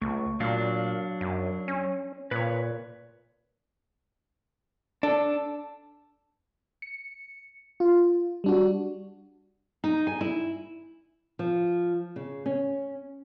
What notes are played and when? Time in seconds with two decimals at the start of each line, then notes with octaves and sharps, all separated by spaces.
0.01 C#2 A3
0.40 A#2 F#3 D4 F5
1.21 F#2
1.68 C#4
2.31 A#2 B4 C#5
5.03 D4 A4
6.82 C#7
7.80 F4
8.44 G3 D4 F#4
9.84 D#4
10.07 G#5
10.21 E4
11.39 F3
12.16 C#3
12.46 C#4